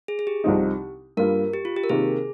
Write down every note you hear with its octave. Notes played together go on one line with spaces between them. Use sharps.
G#4
G#4
G4
C2 C3 F3 C4 D#4
G2 G3 A#3 F4 A#4
G4
F4
G4
A#4
C3 D#3 A#3 G#4